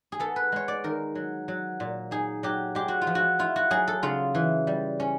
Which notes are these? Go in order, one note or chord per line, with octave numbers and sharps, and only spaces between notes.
G#4
B3 A4
B4
G#3 C#5
D5
D#3 A#4
F#3
F#3
A#2
D#4 G#4
F#3 G4
G#3 G4
F#4
F4
F3
F#4
E4 F4
F#4
F#3 G#4
A4
C#3 F4
E3
G3
C#4